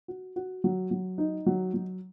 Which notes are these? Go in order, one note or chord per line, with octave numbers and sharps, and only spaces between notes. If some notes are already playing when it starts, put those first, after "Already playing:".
F#4
F#4
F#3
F#3
D#4
F#3
F#3